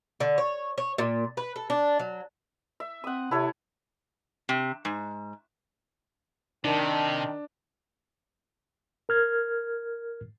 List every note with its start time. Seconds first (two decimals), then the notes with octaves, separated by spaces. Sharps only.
0.20 D3
0.38 C#5
0.78 C#5
0.98 A#2
1.37 B4
1.56 A4
1.70 D4
1.99 F#3
2.80 E5
3.04 C4 F#5 D#6
3.31 C3 E4 A4 C#5
4.49 C3
4.85 G#2
6.64 C3 D#3 D4 G5 A5
9.09 A#4 F6 G#6